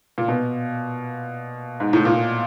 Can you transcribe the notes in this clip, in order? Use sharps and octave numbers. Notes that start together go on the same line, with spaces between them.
A#2
B2
G#2
A2
A#2